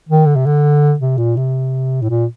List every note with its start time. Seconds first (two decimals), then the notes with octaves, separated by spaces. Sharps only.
0.09 D#3
0.26 D3
0.36 C3
0.46 D3
1.00 C3
1.18 A#2
1.37 C3
2.02 A2
2.10 A#2